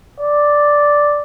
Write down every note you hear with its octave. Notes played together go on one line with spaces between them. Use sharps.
D5